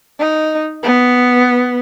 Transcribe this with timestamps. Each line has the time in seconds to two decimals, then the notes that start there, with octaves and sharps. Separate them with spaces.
0.20 D#4
0.83 B3